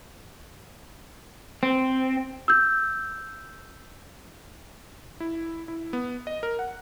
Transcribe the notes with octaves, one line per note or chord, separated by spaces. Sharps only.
C4
E6 G6
E4
E4
B3
D#5
A#4
F#5